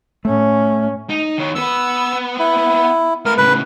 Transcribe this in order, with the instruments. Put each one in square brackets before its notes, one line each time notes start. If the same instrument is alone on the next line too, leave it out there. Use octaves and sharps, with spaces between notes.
[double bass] A2 C#4 [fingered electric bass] A3
[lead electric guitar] D#4
D#3 C#5
[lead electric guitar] B3 B4 [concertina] E6
[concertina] E4
[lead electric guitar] A3 B4 [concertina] A#4
[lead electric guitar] A2 C#3 [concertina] B4